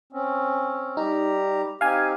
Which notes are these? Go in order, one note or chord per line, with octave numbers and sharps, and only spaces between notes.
C4 C#4
G3 D#4 G4 A#5
C4 D#4 G4 F5 G#5